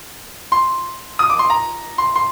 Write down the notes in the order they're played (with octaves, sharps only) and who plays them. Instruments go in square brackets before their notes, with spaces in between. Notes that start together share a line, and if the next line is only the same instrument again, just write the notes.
[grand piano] C6
D#6
D6
C6
A#5
C6
C6